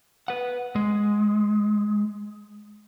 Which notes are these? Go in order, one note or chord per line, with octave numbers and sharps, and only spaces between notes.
B4 F#5
G#3